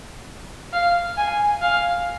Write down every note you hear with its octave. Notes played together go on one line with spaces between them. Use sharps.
F5
G#5
F5